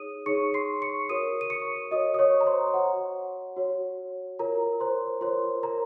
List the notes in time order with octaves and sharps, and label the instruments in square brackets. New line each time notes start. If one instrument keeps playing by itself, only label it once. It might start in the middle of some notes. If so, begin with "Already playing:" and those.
Already playing: [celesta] D#4 G#4 C#5 D#6 D#7
D#4 G#4 C#5 C#6 C#7
C6 C7
C#6 C#7
F#4 A#4 C#5 D#6 D#7
D#7
C#6 C#7
F#4 A#4 C#5 D#5 D#6
D#6
C#5 C#6
A#5
C5 C6
F#4 C#5 F#5
F#4 C#5
F4 A#4 C#5 A#5
C5 C6
F4 A#4 C5 C#5 C6
A#4 A#5